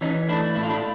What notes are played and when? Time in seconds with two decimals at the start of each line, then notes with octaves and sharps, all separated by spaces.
0.01 E3 C#4 D#4
0.29 A3 D4 E4
0.55 A2 E4
0.63 F4
0.70 D4 E4